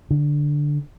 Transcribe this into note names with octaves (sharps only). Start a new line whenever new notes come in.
D3